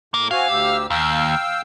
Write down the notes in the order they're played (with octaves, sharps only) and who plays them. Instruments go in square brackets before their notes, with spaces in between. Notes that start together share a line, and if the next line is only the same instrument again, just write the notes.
[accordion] A2 [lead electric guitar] A#3
[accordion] C4 F#4 G#5 [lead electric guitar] F5
[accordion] D2 G4 E6
[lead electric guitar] D#2 [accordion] F5 G5 E6